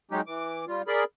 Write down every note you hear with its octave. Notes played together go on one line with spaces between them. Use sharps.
F#3 G#3 C#4 D#4 G4
E3 D6
G3 F4
G#4 A#4 D5 B5